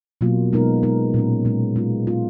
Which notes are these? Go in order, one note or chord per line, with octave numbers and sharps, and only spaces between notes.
B2 F#3 A#3 F4
B2 G#3 B3 D#4 A#4
B2 G#3 B3 D#4 A#4
A#2 G#3 C#4
A#2 G#3 C#4
G#3 B3 F4
G#3 B3 F4